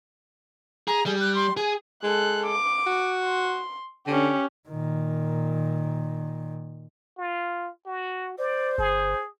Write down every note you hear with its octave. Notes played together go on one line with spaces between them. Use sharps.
G#4 A#5
G3 G#4
F#6
C6
G#4 G#5
G#3 A4 F#6
D6
F#4
C6
D3 C#4 G4
A#2 D#3
F4
F#4
C5 D5
G1 G#4